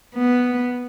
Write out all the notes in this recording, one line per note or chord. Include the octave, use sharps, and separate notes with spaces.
B3